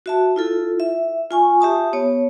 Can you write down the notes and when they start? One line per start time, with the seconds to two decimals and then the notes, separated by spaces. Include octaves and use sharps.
0.06 F#4 E5 A5
0.36 E4 F4 A4
0.80 E5
1.31 F4 G#5 C#6
1.61 G4 E5 A5 D#6
1.93 B3 C#5